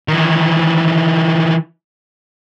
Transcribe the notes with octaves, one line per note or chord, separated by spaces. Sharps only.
D#3 E3